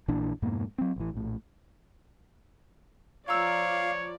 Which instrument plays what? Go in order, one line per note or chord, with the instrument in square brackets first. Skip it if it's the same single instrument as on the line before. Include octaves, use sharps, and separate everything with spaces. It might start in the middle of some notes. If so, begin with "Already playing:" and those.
[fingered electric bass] A#1 A#2 E3 D4
F2 G#2 B2 A#3
F#3 C4
A1 E3
A#1 A2
[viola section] F3 D5 [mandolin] F4 A#5 E6 [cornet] C#5 [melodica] F5